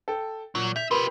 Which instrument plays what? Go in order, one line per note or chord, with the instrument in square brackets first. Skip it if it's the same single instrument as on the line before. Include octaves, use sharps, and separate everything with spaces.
[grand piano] A4 G5
[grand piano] A#2 [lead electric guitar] F#3
[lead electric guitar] E5 [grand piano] G6 F7
[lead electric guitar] F4 G4 [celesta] A#4 B4 B5 [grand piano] C6